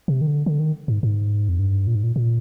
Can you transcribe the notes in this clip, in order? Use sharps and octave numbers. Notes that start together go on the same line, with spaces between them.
C3
D#3
D3
D3
D#3
G#2
G#2
F2
G2
A#2
G#2
A#2
A#2